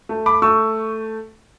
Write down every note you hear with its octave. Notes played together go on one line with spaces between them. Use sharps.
A3
B5 D6
A3 C#6 E6